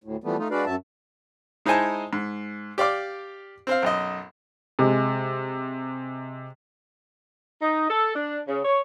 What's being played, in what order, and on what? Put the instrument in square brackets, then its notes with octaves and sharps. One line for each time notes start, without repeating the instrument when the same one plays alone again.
[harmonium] D2 A2
E3 F3 G3 A3 B3
A3 D#4 F4
G#3 D4 F#4 B4 D5 F5
F#2 F#3 E5 A5
[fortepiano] G#3 D#4 E4 C5 G#5 A5
G#2
G4 D5 F5 D6
C4 C5 F5
B1 F#2 D#5
[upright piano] C3 G#3
[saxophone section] D#4
A4
D4
C#3
C#5